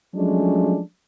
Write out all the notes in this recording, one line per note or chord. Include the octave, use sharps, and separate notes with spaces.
F3 F#3 G#3 A3 C#4 D4